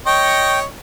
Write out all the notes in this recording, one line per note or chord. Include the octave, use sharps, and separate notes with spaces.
C#5 D#5 G5 C#6